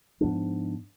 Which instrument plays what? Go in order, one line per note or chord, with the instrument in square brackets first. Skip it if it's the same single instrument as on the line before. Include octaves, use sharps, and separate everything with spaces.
[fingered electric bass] G#2 F3 B3 D4